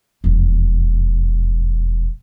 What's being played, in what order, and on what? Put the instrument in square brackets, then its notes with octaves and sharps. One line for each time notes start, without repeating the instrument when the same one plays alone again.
[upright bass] E1 F2